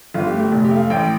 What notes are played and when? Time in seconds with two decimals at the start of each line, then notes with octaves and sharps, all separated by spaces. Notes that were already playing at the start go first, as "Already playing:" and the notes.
0.14 G1 F4
0.27 G4
0.34 A3
0.40 G4
0.52 F1
0.65 G4
0.70 A3
0.77 F5
0.90 A1 G5